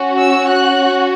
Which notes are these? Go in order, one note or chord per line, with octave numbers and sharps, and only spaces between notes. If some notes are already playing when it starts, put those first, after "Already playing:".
Already playing: C#4 F#4
E6
F#6